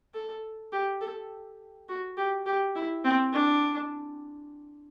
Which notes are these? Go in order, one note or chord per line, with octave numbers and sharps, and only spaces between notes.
A4
G4
A4
F#4
G4
G4
E4
C4
D4